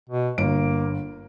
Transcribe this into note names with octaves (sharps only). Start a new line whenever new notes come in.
B2
G1 A#3 D7